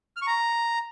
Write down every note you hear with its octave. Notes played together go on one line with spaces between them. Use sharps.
F6
C#6
A#5